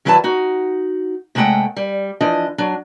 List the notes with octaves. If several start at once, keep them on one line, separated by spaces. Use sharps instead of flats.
D#3 F#3 E4 B4 F#5 A5
D#4 F#4
C3 G#3 A3 A4 F#5 G5
G3
E3 F3 D4 D#5
F#3 D4